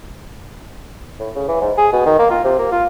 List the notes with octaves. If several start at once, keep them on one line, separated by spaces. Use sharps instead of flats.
A2
C#3
E3
G#2
G#4
B2
D#3
A#3
F4
C3
A#3
F4